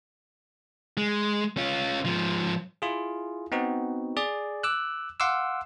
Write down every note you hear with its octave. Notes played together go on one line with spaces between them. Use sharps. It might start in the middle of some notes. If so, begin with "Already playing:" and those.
G#3
C#4 F4
G#2 F3
E4 F4 G#4
B3 C4 D#4 F#4
G#4 D5
D6 E6 F#6
F5 F#5 C6 D6 E6